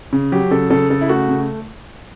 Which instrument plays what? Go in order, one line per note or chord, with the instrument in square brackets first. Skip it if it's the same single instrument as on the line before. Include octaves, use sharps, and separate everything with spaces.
[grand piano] C#3
F#3 G4
C#3 A4
C#3 A4
C#3 A4
E4
A3 F#4
C#3